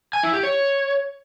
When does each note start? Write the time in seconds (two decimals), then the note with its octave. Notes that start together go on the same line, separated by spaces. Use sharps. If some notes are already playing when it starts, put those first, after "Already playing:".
0.13 G#5
0.23 E4
0.33 G4
0.43 C#5